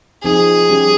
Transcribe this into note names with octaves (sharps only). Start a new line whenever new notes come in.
F3 C4 D#4 G#4
G3 C#4 G4